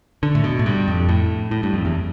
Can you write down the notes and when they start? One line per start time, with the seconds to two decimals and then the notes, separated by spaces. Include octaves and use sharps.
0.23 D3
0.35 A2
0.44 B2
0.59 A2
0.66 G2
0.88 F2
1.09 A2
1.51 A2
1.63 G2
1.74 F2
1.85 E2